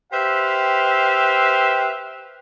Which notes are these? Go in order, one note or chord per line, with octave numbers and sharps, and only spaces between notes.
G4 B4 C5 E5 F5